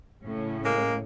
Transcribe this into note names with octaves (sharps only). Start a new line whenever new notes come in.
A2 C#3 C#4
G#3 A#3